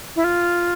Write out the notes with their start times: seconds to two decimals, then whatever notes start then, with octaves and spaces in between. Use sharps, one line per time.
0.16 E4
0.24 F4